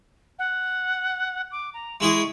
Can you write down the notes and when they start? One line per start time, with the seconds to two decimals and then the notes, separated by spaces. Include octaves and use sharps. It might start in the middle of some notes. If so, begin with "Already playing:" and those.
0.39 F#5
1.51 D6
1.74 A#5
2.00 G#3 E4 G#4 C#6